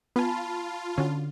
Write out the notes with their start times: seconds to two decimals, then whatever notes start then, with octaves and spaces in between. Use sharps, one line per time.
0.16 B3 F4 G#5 A5 B5
0.98 D3 C#4 F#4